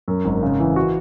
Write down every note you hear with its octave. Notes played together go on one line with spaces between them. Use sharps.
F#2
G#1
C#3
E3
F#4